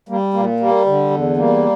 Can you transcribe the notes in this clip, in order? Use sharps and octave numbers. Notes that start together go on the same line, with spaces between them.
G3 A#3
A#2 A#3
G3 A#3
D3
E2
G3 A#3